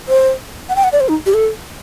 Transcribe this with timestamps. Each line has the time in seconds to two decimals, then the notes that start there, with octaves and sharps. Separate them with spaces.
0.08 C5
0.69 F#5
0.76 G5
0.84 F#5
0.93 D5
1.00 C5
1.08 D#4
1.26 G4
1.34 A4